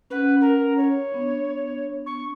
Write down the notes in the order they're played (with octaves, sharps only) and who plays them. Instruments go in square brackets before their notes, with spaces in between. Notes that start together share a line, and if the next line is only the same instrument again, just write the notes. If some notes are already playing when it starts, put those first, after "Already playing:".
[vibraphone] C#4 F#5 [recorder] B4
[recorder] A#4
C#5
[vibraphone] B3 D4
[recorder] C#6